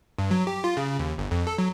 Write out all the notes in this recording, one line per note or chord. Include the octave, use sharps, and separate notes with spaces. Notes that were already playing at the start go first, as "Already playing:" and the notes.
G2
F#3
G4
F4
C#3
D#2
G1
F2
A4
F#3